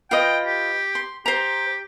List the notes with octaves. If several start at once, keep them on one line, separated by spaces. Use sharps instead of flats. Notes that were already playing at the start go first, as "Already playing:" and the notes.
F4 B4 D#5 G5
G4
C6
G4 C5 A#5